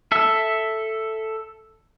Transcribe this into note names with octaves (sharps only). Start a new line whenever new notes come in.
A4 E5